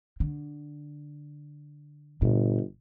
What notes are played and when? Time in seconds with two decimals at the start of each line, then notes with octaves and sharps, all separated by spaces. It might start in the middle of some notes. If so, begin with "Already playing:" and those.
0.20 D3
2.22 G1 A#2